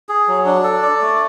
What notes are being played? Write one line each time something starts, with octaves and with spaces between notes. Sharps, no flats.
G#4
F#3
D4
A4
D5
A3